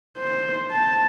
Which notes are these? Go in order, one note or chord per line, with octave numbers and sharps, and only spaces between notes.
C5
A5